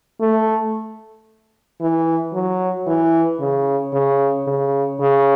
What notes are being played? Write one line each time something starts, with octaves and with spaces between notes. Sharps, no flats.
A3
E3
F#3
E3
C#3
C#3
C#3
C#3